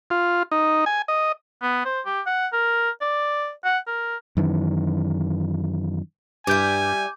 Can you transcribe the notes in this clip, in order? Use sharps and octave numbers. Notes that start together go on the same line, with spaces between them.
F4
D#4
G#5
D#5
B3
C5
G4
F#5
A#4
D5
F#5
A#4
F#2 D#3 E3
G2 G3 E4 G#5 D6 G6